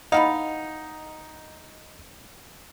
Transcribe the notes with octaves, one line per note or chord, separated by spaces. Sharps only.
B3 D#4 E4 D#5 F5 F#5